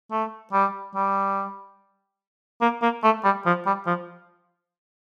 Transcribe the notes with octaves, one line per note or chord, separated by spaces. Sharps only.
A3
G3
G3
A#3
A#3
A3
G3
F3
G3
F3